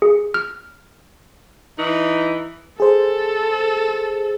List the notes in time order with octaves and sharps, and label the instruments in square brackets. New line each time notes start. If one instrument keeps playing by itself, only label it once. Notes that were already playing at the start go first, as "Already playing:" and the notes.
[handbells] G#4
F6
[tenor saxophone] E3 [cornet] D#4
[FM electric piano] G#4 C5 [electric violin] A4